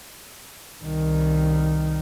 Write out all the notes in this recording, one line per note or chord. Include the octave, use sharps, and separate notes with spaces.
C2 D#3